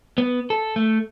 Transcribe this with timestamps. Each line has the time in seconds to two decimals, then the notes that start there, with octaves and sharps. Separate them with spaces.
0.18 B3
0.50 A4
0.76 A3